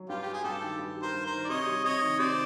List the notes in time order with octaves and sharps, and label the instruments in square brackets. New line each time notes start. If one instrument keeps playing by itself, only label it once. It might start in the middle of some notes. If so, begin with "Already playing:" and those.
Already playing: [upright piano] F#3
[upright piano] G2 [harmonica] F4 G4
[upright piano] G3 [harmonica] G4
[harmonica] G#4
[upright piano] G2 [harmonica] G4 A4
[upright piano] D#3
G2
G3
[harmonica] A#4 C5
[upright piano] G2
[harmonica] A#4 C5
[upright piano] D#3
[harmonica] D5
[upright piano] C3 [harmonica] C#5 D#5
[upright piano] G3
[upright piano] C3 [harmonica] C#5 D#5
[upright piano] D#3
[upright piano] C3 [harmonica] C5 D5